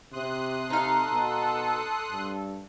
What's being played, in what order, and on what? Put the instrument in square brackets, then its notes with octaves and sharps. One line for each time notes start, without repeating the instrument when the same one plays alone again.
[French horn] C3 [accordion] C6 D#6 F#6
[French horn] C3 [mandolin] D#4 F5 [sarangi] A4
[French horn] B2
G2